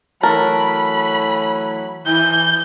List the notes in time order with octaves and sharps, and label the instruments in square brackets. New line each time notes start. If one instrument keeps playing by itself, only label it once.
[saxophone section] E3 F#3 A3 [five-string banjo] A#4 [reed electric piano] A5 [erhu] B5
[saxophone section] E3 [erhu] G6